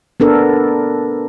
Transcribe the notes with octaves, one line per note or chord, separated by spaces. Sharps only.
B3 D4 A4 A#4